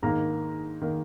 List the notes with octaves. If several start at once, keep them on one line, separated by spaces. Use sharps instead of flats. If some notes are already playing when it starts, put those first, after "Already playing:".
G#2 D#3 A#3 A#5
D#3 A#3